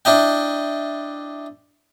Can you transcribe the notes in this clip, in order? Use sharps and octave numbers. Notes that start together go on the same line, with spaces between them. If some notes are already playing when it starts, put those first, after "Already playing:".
D4 E4 D#5 G5